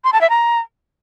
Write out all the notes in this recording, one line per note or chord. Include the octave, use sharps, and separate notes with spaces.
C6
A5
E5
A#5